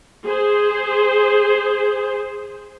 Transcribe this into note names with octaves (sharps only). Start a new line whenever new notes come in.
G#4 C5